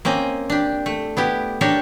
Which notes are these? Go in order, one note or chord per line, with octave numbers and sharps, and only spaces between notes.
A#3 C4 C#4 D#5
D4 G4
A3
B3 E4 G4
D4 G4 A4 A#4 C#5